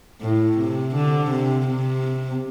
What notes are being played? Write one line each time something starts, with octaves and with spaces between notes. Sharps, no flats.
A2
C3
D3
C3
C3